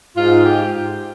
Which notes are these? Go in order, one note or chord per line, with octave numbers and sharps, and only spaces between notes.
G#2 F4
G4